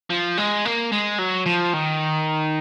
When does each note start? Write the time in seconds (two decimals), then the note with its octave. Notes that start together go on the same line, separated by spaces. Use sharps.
0.10 F3
0.38 G#3
0.65 A#3
0.92 G#3
1.19 F#3
1.46 F3
1.73 D#3